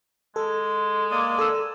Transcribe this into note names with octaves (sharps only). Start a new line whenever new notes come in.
G#3 A4
A#3 D5 D#6
A4 E6